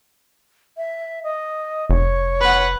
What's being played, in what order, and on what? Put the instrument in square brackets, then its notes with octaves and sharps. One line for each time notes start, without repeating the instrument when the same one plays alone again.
[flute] E5
D#5
[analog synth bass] F1 [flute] C#5
[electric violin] B4 F#5